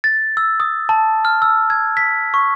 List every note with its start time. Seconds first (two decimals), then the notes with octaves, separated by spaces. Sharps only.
0.04 A6
0.37 E6
0.60 D#6
0.89 A5
1.25 F6
1.42 E6
1.70 G#6
1.97 B6
2.34 C#6